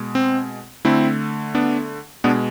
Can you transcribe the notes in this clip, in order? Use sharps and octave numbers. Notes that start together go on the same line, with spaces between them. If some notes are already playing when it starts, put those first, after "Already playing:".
Already playing: B2 G#3
C4
D3 A3 C4 E4
B3 D4
B2 G#3 B3 D4